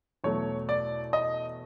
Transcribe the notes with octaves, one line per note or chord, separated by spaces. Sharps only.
E2 B2 F#3 A3 C#5
D5
D#5